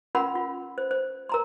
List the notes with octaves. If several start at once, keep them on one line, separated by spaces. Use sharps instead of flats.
C#4 F4 A#4 F#5 B5 C6
F4
C5
C5
A#4 A#5 C6